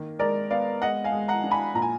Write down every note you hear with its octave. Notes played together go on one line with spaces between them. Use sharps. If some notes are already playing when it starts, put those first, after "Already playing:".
Already playing: D#3 A#3
G#3 A#4 D5
B3 D5 F5
G#3 D#5 F#5
F5 G#5
G#3
F#5 A#5
D4
G#5 B5
A#2 A#5
G#5